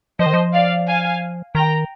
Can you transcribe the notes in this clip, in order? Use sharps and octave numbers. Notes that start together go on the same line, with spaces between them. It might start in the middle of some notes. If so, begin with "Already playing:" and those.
F3 C5 D#5
D#3
F3
D5 F5
F5 G#5
D#3 G5 A#5